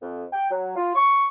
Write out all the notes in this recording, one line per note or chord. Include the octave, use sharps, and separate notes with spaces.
F2
G5
F#3
F4
C#6